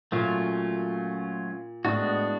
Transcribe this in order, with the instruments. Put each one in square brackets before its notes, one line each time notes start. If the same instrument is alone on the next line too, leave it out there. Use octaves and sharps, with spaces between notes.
[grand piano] A#2 [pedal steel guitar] F#3 A3 C#4 F4
[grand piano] A2 [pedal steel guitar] G#3 B3 D4 F#4